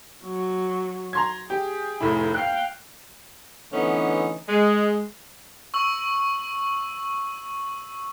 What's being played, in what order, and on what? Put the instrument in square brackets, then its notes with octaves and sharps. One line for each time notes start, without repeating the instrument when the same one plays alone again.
[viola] F#3
[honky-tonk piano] A#5 C6 G#6
[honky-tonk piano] G4 [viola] G#4
[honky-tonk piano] F1 A2 E4
[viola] F5 G5 [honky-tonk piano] F#6 C7
[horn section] D3 E3 A3 B3 C#4 D#4
G#3
[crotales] C#6 E6 F#7